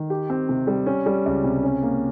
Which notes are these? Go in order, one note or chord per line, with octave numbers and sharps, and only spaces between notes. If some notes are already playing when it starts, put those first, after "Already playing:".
Already playing: D#3
G4
C4
C3
G3
C#4
G3
C#2
C3
C#4
A#3